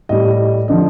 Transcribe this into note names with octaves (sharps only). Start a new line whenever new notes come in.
A2 G3 D#5
D3 F3 D#5